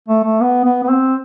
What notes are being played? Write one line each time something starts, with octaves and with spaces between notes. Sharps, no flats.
A3
A3
B3
B3
B3
C4